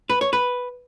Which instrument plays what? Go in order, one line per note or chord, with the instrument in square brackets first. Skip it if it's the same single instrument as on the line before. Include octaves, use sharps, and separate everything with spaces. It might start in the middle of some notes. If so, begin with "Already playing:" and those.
[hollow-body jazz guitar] B4
C#5
B4